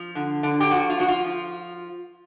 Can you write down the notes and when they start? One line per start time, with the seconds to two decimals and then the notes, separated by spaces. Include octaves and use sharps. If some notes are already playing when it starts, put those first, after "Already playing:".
Already playing: F3
0.15 D3
0.43 D3
0.60 G4
0.71 F3 F#4
0.90 F4
0.99 F3 F#4
1.08 F4
1.26 F3